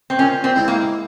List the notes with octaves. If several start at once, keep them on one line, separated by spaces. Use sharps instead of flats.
C4
A#2 C#4
C4
G#3 E4
A#3